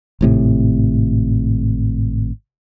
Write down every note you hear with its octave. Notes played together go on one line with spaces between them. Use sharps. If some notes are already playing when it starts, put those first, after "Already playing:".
G#1 A2 C3